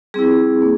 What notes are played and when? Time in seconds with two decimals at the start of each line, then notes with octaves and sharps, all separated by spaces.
0.14 G3 C4 E4 G#4
0.62 A#3